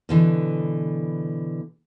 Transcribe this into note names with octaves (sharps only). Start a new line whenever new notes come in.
B2 D3 E3